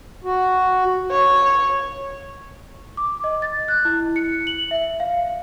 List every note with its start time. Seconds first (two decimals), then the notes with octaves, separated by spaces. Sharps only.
0.24 F#4
1.11 C#5
2.97 D6
3.24 D#5
3.42 A6
3.68 F#6
3.85 E4
4.16 C#7
4.47 F#7
4.71 E5
5.00 F5